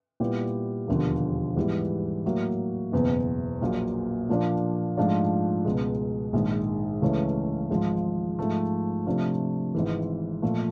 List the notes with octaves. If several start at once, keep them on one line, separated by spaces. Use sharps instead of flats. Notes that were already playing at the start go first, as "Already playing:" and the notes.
A#2 G3 B3 E4 G4
E1 D#2 D3 F3 A#3
G#2 E3 G3 B3
A2 F#3 A#3
F#1 E2 B2
A#1 A#2 F#3 A#3
A#2 F3 A#3 D4
G#2 F3 A3 D4 F4
C#2 B2 G#3
A#1 G#2 D#3 G#3
C#2 C#3 E3 A3 C#4
G#1 G#2 F3 G#3
G#2 F3 A3
C3 F3 A3 D4 F4
G#1 G#2 E3
A#2 F3 A3